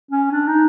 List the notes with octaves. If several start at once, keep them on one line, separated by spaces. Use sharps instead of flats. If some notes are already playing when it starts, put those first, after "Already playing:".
C#4
D4
D#4